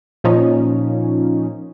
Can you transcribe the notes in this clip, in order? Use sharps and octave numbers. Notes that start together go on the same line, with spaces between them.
A#2 F3 C#4 D#4